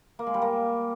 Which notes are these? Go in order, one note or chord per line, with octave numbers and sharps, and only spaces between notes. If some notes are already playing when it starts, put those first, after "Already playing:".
A#3
G#3
G3
A#3